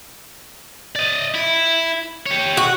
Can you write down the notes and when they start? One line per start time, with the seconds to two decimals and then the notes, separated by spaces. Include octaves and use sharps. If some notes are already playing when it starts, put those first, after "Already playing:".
0.96 D5 D#5
1.35 E4
2.26 G4 C#5
2.57 F#4